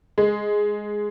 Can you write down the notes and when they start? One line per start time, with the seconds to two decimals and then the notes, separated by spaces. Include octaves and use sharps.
0.18 G#3